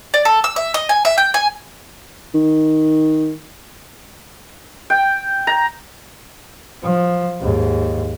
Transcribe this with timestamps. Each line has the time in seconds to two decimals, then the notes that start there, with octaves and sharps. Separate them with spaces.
0.14 D5
0.25 A4
0.44 E6
0.56 E5
0.74 D#5
0.89 G#5
1.05 E5
1.18 G5
1.34 G#5
2.34 D#3
4.90 G5
5.47 A#5
6.83 F3
7.41 D#2 G#2